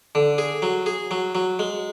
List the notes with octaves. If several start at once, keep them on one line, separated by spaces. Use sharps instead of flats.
D3
G#4
F#3
G#4
F#3
F#3
G#3